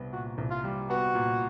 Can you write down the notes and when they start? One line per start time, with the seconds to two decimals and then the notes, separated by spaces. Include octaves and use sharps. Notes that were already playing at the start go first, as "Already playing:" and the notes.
Already playing: C2 G3 B3
0.12 A#2 F#4
0.38 C2
0.50 F4
0.64 G3
0.90 B3 F#4
1.15 A#2